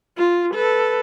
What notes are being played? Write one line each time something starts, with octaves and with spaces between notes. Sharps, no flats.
F4
A4 B4